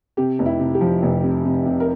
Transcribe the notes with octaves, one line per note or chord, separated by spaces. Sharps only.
C3 G4
F1
E4
C3
G4
F3
F1
C3
C3
C3
A#4